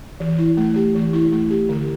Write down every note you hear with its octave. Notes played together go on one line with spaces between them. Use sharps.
E3
E4
A3
G4
E3
E4
A3
G4
D3